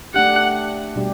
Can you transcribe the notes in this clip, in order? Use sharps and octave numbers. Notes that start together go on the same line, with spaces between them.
A3 D4 G4 F#5
B2 G3 D4 G4